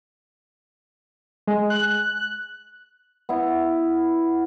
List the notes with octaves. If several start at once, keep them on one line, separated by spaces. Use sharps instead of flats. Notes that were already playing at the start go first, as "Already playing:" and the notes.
G#3
F#6
B3 E4